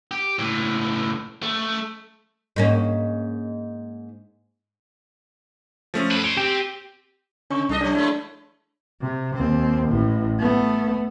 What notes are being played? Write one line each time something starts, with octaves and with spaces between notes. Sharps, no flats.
G4
C#2 A2
A3
G#2 A#3 C#4
F3 A3 C#4
F#2 B4
C#5 C6 D7
C4 G4
C#3 C#4 C#6
C2 D4 A4 D#5
F#3 D4 G4 C#5
G#3 A3 E4
C3
D#2 C4
A1 A2
A3 B3